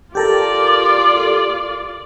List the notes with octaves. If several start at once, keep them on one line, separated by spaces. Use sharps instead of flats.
F4 G4 A4 A#4 D5 D6